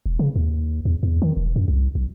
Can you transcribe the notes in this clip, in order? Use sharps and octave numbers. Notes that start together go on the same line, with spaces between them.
E1
C#3
D#2
E2
E2
D#3
E1
F#2
C2
B1